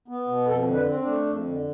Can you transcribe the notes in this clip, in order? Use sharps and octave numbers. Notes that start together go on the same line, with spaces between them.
B3
B2
F2 A4
D3
B4
C4
D4
A3
F2
D3